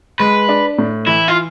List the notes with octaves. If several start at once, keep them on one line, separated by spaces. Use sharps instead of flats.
G#3 B4
D4
A2
E3 E4
F4